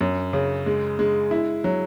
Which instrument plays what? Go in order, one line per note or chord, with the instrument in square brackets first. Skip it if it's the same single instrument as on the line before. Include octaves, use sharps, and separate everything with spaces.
[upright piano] F#2
C#3
G#3
G#3
E4
F#3